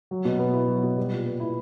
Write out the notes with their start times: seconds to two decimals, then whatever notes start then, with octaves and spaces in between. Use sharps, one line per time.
0.11 F#3
0.25 B2
0.39 B3
0.54 E4
0.68 F#3
0.84 B2
0.97 G3
1.12 A#2
1.26 B3
1.40 E4